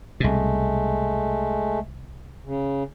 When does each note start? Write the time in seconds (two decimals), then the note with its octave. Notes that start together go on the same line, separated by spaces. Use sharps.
0.20 C2 B2 G#3 A3
2.44 C#3